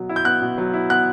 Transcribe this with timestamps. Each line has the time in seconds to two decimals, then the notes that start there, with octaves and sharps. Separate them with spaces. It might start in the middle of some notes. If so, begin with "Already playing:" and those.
Already playing: B2 F#3 B3
0.09 E4
0.16 G6
0.25 B3 F#6
0.42 B2
0.58 F#3
0.74 E4
0.90 B3 F#6